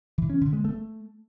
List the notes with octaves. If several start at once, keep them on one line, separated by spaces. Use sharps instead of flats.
E3
C#4
D3
G#3
A3